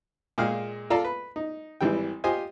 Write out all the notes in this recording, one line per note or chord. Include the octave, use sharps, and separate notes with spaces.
A#2 G#3 G#4 F5 G5 F6
F4 A4 D5 F5 A5 A#5
B4
D#4
G#1 E3 G3 G5
F4 G4 C5 D#5 G#5